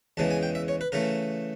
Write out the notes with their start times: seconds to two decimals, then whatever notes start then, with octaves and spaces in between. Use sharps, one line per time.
0.17 E2 C#3 E3 G#3 A5
0.31 G#5
0.43 G5
0.55 E5
0.68 C#5
0.81 B4
0.92 C#3 E3 A3 A#4